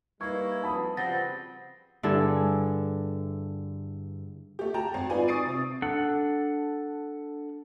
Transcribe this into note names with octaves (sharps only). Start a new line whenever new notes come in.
G3 A#3 D#4 E4 B4 C#6 G#6
F2 F#4 B4 A5 B5 D#6
C#3 F3 G3 B3 C4 F#5 A6 A#6
G2 D3 E4 G#4 A4
A3 G4
F#4 G5 A5 A#5
G#1
D#4 F4 B4 D5 G#5
C#6 D#6 A6 C7 D7 D#7
C3
D4 A4 F#5